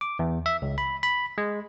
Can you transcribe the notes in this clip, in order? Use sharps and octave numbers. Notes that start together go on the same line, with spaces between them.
D6
E2
E5
C#2
B5
B5
G#3